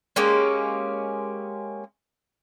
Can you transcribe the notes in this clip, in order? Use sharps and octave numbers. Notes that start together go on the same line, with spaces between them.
G#3 A#3 C#4 G4